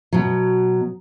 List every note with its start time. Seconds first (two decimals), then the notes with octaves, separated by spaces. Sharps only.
0.13 B2 F#3